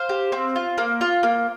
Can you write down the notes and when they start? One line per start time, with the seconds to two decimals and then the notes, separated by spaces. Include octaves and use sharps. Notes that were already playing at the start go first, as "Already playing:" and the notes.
Already playing: C5 F5
0.09 G4
0.32 C4
0.56 F4
0.78 A#3
1.01 F4
1.23 A#3